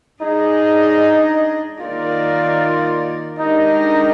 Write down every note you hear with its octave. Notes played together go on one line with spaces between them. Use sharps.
G#3 D4 D#4 G#4 D#5
D#3 A#3 D#4 F4 A#4 D5
G#3 D4 D#4 G4 A#4 D#5